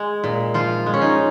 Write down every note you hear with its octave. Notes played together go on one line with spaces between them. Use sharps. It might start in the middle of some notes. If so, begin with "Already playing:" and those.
Already playing: G#3
A#2
F3 F4
G#3
C#4
D#4